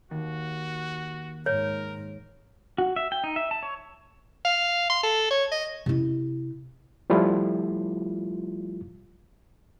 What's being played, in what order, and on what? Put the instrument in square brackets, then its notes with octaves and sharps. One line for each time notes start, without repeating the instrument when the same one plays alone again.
[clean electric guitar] D#2 [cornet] F#4
[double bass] G#2 [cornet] A#4 [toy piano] C#5
[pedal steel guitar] F#4
E5
G5
D#4
E5
A5
C#5
[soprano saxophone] F5
C6
A4
C#5
D#5
[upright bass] C3 E4
[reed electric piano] F3 G3 A3 E4 F4